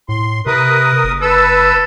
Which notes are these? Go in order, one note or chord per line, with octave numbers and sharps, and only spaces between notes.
A2 C6
C3 A#4 B4 D#6
F#1
A4 B4 E6